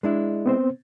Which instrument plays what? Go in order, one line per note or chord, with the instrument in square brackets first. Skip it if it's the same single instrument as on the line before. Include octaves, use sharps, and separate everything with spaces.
[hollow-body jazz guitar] G#3 D4 E4
[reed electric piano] B3 C4 C5